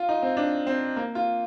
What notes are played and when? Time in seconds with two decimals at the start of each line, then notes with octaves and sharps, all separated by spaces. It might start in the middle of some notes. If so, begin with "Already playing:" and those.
Already playing: F4
0.09 D#4
0.22 C4
0.37 D4
0.67 C4
0.96 A#3
1.15 F4